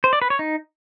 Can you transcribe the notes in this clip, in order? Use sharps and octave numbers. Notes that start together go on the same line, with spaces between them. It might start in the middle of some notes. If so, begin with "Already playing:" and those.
C5
D5
B4
C#5
D#4